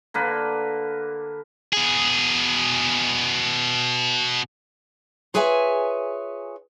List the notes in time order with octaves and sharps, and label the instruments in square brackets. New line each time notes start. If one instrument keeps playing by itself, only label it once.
[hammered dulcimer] D3 A#3 B4
[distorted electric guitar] B2 G#4
[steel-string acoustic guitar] F4 G#4 B4 C#5 E5 G#5